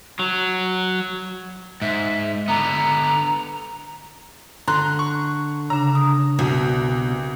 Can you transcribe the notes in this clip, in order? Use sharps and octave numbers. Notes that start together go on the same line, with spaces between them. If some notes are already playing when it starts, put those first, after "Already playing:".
F#3
G#2 E5
D3 B3 A#5
D3 A#5 C6 F#6
C#6
C#3 D4 A#5
D#6
C2 B2